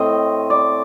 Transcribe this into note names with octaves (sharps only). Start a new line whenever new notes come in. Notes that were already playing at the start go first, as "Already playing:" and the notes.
Already playing: A2 A3 C4 D#5
D5